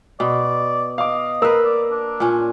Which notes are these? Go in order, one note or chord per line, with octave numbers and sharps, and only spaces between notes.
B2 D5
D#5 F5 D6
A#3 A#4 B4 E6
D5
D4
A#2 C#4